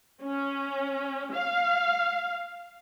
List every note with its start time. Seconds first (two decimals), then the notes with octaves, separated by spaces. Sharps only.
0.23 C#4
1.34 F5